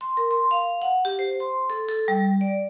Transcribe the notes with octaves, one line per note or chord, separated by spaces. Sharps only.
C6
A#4
C6
F5
F#5
G4
C5
C6
A4
A4
G3
D5